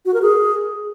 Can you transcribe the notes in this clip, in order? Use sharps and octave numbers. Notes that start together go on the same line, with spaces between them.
F#4
A#4
G#4